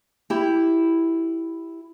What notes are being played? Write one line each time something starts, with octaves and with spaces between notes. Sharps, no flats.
E4 G4